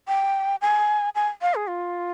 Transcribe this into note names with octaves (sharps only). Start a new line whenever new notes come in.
G5
G#5
G#5
F5
G#4
F4